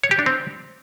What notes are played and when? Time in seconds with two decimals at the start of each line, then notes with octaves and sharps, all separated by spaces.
0.04 C#5
0.11 G4
0.19 D4
0.26 C4